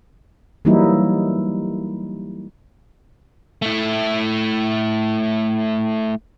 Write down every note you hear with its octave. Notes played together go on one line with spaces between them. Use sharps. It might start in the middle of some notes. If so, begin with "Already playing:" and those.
E3 F#3 G3 A#3 D#4 E4
A3 E4